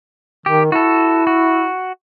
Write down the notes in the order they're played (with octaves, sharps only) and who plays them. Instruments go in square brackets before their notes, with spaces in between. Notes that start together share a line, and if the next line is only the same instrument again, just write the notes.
[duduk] D#3 [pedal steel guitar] G4
[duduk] E4 [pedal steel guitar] F#4 A4
[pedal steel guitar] F#4